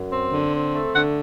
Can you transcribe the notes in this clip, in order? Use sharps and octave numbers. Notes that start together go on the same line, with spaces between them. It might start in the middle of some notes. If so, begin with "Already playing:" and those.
Already playing: F#2
C4
D3
C4
A3
D3 F#5